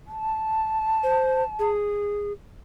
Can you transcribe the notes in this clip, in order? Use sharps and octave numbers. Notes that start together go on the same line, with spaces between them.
A5
C5
G#4